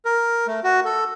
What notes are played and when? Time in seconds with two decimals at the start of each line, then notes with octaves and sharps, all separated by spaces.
0.05 A#4
0.47 A3
0.64 F#4
0.85 A4